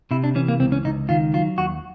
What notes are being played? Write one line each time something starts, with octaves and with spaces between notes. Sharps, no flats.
C3 E4
D4
E3 C#4
A#3
C#2 C4
C#4
C#2 D#4
D#3 F4
F#3 F4
D#2 F#4